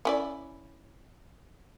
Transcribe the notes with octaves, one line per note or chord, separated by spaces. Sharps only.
C#4 E4 D5